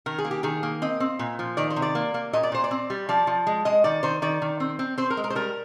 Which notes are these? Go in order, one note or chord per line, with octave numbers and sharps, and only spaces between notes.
D#3 A#4
G#4
A#3
G4
D#3 G#4
A#3
C4 D#5
C4
A#2
F3
D#3 D5
C5
C3
D5
A#3
A#3
A#2 D#5
D5
A#2 C5
D5
C4
G3
F3 D5
F3
G#3
G#3 D#5
D#3 D5
D#3 C5
D#3 D5
D#3
C4
C4
C4 C5
A#4
G#3
A#4
C5
G3 A#4